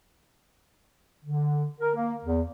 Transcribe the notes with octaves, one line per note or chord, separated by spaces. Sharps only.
D3
A#4
A#3
E2